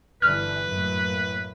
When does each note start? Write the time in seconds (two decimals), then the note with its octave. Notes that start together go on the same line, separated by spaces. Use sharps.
0.22 G1 D3 E3 B4 F6
0.66 F#2 A2 A#3